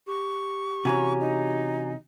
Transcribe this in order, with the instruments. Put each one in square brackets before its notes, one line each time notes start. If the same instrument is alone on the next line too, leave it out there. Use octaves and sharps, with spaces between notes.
[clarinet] G4 [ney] C#6
[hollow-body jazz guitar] C3 E3 C#4 [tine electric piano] F#4 G#5 A#5
[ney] D#4